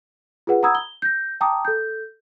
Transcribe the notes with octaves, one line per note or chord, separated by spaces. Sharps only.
F4 G#4 B4 F#5
F#5 A#5 B5 D#6 E6 G#6
G7
G6 A#6
G5 A5 A#5 D6 D#6
A4 G6